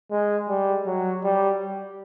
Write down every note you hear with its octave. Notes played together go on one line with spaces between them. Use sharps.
G#3
G3
F#3
G3